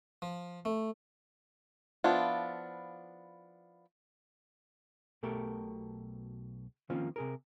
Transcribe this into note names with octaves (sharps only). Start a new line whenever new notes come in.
F3
A3
F3 B3 D4 E4 F4
B1 B2 A3 G4 A4 A#4
D#3 F3 A#3 C4 C#4 F4
C3 G#4 A#4